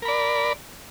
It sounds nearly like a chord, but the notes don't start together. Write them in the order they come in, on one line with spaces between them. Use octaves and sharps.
A#4 B5 D5